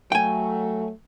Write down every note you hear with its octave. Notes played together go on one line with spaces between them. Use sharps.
F#3 A3 G5 G#5